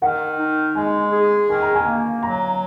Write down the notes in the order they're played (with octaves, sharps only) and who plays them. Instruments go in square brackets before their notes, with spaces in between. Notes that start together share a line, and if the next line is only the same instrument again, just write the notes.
[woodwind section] D#3 [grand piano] F#5
[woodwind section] D#4
[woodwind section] G#3 [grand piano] G#5
[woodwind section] G#4
[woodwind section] D#3 [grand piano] G#5
[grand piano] A#5
G#5
[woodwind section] A#3
[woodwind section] F#3 [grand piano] A#5